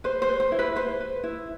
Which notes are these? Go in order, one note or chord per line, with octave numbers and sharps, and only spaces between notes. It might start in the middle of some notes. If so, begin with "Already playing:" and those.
B4 C5
C5
B4
C5
E4
B4
B4 C5
B4
E4